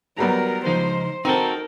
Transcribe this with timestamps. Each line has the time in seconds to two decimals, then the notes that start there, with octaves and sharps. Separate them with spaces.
0.18 F#3 G3 B3 A#4
0.66 C#2 F3 D#4 C5
1.25 C4 D#4 F#4 A4 A#4